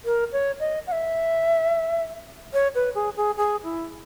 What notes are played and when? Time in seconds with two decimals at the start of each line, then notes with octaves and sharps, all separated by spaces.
0.05 A#4
0.32 C#5
0.60 D#5
0.87 F#5
0.92 E5
2.53 C#5
2.75 B4
2.95 G#4
3.17 G#4
3.37 G#4
3.64 E4